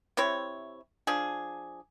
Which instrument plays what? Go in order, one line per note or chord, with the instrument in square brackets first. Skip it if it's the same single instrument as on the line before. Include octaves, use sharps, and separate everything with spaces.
[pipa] C3 C4 E4 C#5
F3 D4 G#4